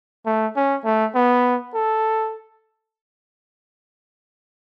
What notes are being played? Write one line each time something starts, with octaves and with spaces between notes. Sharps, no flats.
A3
C#4
A3
B3
A4